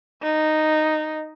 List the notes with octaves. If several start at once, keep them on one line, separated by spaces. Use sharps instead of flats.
D#4